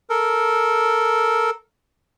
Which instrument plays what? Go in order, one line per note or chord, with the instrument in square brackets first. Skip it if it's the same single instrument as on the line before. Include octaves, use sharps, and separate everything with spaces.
[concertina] A4 A#4